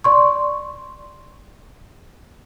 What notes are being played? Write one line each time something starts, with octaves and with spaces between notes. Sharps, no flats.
D5 C6 C#6